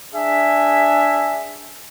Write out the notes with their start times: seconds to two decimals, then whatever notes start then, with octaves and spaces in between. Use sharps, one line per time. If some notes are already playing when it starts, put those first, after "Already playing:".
0.14 D4 G#4 E5 G#5